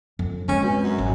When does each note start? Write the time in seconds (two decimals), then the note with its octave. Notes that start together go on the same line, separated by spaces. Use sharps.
0.19 F2
0.48 G#3 C4 C#4
0.63 B2
0.83 F#2
0.99 G#1